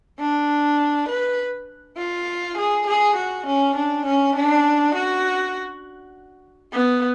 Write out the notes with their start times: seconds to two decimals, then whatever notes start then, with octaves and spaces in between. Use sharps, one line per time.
0.20 D4
1.09 B4
1.98 F4
2.58 G#4
2.87 G#4
3.16 F#4
3.47 C#4
3.76 D4
4.06 C#4
4.36 D4
4.95 F#4
6.73 B3